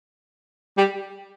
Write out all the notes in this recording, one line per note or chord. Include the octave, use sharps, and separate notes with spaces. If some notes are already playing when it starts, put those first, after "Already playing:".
G3